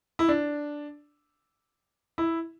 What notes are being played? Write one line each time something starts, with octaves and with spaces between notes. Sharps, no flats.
E4
D4
E4